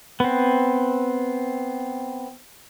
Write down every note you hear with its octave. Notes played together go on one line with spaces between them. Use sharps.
B3 C4